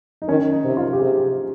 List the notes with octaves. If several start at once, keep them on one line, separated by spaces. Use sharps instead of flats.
D#4
D#3 C#4
D#4
C3
F4
G4
C3 G#4